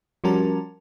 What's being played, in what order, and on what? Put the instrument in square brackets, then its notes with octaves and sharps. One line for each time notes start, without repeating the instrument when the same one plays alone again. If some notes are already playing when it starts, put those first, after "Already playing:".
[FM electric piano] F3 G3 C#4 F#4 A#4 A5